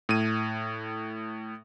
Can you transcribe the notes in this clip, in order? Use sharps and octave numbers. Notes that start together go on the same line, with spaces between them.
A2 D#7